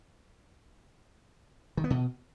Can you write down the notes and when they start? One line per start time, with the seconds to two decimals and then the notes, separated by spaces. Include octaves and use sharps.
1.77 D#3
1.84 B3
1.90 B2